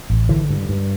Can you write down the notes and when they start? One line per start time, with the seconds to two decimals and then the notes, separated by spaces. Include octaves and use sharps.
0.10 A1
0.29 D3 E3
0.50 G2
0.69 G2